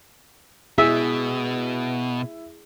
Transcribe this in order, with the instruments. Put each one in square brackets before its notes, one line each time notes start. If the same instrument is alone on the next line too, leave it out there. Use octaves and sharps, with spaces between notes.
[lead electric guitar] B2 [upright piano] E4 [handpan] G#4 [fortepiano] E5